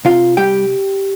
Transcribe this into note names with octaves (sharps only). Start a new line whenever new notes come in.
C3 F4 F5
G3 G4 G5